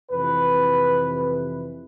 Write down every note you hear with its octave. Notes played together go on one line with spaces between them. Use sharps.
F2 C3 E3 B4